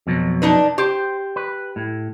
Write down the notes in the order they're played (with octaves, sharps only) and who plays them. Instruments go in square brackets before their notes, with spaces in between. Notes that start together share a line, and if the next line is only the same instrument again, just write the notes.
[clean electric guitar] F2 B2 F#3
[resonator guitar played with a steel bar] D4 D#4 B4
[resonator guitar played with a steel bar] G4 [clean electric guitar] C5
[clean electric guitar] B4
A2